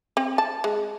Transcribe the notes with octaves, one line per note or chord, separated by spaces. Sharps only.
C4
A5
G#3